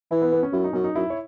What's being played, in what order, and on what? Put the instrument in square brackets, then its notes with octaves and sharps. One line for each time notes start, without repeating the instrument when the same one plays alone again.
[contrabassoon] E3 [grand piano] E4
[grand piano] B3
B3
C#4
[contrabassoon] F#2 [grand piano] E4
[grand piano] D#4
[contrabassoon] F#2 [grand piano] C#4
[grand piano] D#4
[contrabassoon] F#2 [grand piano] E4
[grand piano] C#5